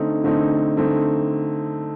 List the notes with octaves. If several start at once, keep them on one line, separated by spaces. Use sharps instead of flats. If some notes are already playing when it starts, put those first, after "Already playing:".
Already playing: D3 A3 C4 D#4
D3 A3 C4 D#4
D3 A3 C4 D#4